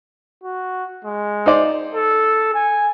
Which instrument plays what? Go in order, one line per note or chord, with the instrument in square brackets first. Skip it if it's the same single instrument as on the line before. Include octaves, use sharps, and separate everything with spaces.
[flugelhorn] F#4
G#3
[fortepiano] D#4 C5 D5
[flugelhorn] A4
G#5